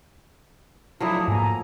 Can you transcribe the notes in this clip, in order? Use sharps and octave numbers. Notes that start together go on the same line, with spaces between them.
F3 F#3 A3 D4 E4 D#6
G#2 A#3 G#5 A#5